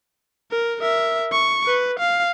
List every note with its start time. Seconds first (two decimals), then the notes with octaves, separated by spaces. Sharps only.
0.51 A#4
0.81 A#4 E5
1.32 C#6
1.66 B4
1.99 F5